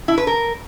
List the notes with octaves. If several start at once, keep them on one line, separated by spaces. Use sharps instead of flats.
E4
B4
A#4